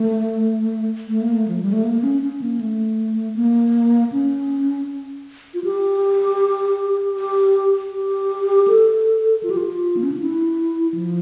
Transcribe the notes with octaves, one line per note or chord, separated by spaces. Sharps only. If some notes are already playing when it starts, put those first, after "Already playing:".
Already playing: A3
A3
A#3
A3
F3
G3
A3
A#3
C#4
C#4
A#3
A3
A#3
C#4
F4
G4
G4
G4
A4
F4
G4
F4
A#3
C#4
D4
E4
F3